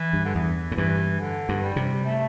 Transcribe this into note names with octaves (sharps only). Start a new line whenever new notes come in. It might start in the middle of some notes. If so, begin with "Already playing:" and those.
Already playing: E3
G2
D3
E2 E3
A2
G2 E3
D3
G2
G3
C3
A3